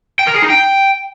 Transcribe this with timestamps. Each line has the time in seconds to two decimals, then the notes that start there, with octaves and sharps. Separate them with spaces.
0.19 G5
0.27 A#4
0.34 G#4
0.42 D#4
0.50 G5